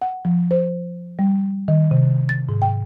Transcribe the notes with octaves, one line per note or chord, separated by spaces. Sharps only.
F#5
F3
C5
G3
D#3
C3
A6
G#2
G5